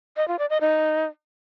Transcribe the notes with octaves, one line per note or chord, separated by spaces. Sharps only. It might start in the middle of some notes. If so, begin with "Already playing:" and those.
D#5
F4
D5
D#5
D#4